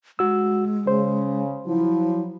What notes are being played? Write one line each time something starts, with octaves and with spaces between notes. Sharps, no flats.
G#3 F#4 E6
C#3 C5
F3 F#3 E4